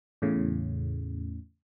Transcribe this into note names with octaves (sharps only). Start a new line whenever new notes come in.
E2 A2 C#3